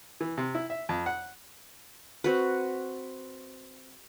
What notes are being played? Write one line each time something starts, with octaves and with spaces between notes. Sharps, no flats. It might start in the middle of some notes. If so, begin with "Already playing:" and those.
E3
C3
E4
E5
F2
F#5
C4 F#4 B4